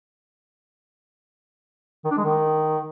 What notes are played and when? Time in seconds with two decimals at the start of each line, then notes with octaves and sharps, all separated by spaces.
2.05 D#3
2.11 D4
2.17 G#3
2.24 D#3